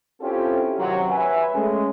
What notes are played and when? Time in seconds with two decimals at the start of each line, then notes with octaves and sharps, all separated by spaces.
0.21 C4 C#4 E4 F4 G4 A4
0.77 F#2 C3 D#3 F#3
1.10 B4 E5 G#5
1.54 G#3 A3 C#4